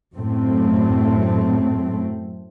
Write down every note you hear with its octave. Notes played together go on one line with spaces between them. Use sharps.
F#2 A2 A3 C4